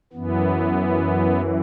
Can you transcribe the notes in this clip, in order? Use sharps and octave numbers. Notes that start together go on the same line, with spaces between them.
F#2 E3 B3